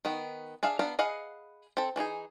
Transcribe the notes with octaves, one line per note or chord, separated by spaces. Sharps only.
D#3 B3
D4 G#4 E5 F5
B3 D4 F5 A#5
G#4 B4 D#5 F5 F#5
C4 A4
E3 D4 D#4 G#4